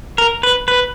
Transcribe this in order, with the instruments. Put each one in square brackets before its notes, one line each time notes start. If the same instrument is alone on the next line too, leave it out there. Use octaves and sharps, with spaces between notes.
[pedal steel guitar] A#4
B4
B4